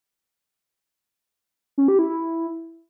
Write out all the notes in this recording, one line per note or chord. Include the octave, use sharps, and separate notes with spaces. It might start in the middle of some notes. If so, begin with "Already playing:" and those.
C#4
G4
E4
E4